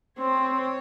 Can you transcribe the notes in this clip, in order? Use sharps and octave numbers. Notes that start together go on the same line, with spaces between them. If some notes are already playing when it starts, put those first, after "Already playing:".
C4 C#5